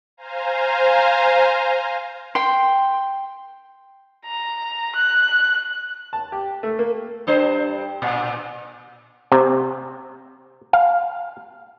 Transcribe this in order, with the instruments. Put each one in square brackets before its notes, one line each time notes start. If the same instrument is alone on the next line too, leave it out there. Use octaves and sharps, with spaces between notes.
[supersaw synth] C5 F5 G#5 A#5
[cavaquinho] G5 C6
[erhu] A#5
F#6
[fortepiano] A5
G4
A3
A#3
[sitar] G2 D4 C5
A#2
[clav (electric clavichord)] C3
F5